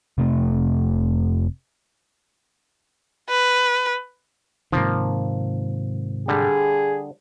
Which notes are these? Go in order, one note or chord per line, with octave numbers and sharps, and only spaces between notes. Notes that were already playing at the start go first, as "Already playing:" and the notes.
F1 C3 A3
B4
G#2 C3 D#3 F3 A#3
D3 G3 G#4